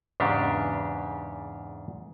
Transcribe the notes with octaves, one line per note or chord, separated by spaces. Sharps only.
E2 G#2 C#3 D4 G4